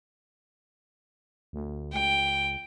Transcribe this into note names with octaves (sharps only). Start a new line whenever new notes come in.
D2
C#2 G5